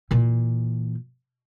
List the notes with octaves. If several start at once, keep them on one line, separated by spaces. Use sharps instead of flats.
A#2 E3